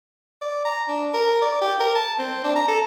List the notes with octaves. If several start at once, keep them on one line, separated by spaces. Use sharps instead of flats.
D5
A#5
D4
A#4
D5
G4
A#4
A5
C4
D4
A#5
A4